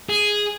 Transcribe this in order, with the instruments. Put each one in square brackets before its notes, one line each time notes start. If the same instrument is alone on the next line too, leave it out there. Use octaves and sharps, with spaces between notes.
[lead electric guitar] G#4